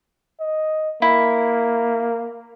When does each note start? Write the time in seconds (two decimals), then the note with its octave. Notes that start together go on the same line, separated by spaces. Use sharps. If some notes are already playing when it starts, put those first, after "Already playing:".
0.40 D#5
1.02 A#3 E4